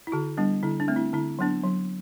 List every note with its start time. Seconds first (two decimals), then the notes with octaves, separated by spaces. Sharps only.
0.07 E4
0.12 D3 F#4
0.37 G3 B3 D4
0.63 D3 E4
0.80 D4
0.88 A3 C4
0.96 E4
1.13 D3 E4
1.39 F#3 B3 D4
1.64 F#3